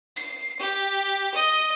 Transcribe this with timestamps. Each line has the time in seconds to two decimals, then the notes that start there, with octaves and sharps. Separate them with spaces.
0.17 C7
0.60 G4
1.35 D#5